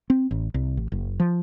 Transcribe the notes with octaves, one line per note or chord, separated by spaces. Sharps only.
C4
A1
C2
A1
F#1
F3